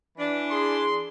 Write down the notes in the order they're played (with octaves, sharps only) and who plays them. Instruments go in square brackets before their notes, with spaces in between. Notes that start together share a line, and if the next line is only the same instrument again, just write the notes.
[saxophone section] E3 D4
[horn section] G#4 C6